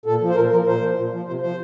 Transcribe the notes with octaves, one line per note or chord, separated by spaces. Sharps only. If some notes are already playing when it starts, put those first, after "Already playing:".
A#2 A4
F3
C5
A#2 A#4
F3 A#4
A#2 C5
F3
A#2
F3
C3 C5
F3 C5